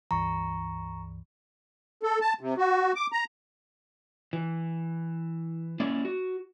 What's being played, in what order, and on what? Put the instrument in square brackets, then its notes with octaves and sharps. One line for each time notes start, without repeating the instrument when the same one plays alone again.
[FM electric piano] C#2 G2 E3 [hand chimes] A#5 C#6
[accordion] A4
A5
C3
F#4
D6
A#5
[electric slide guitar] E3
A#3 C#4 E4 D5
F#4